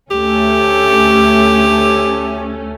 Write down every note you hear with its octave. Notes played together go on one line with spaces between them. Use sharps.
D2 A3 C#4 G4